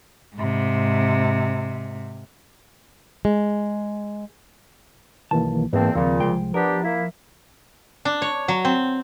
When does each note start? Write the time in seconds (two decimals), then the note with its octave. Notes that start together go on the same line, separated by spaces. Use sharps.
0.36 G#2 C3
3.25 G#3
5.31 B1 D#3 E3 A#3 A5
5.73 E2 G#2 E3 A#3 C4 A5
5.95 D#2 A#2 C#3 F3 C4
6.20 C2 F3 G#3 G5
6.54 B3 D4 G4 A#4
6.84 A#3 E4 E5
8.05 D4
8.22 C#5
8.48 F#3
8.65 C4